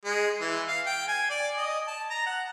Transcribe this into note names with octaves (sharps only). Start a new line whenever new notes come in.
G#3
E3
F5
G5
G#5
D5
D#5
A5
A#5
F#5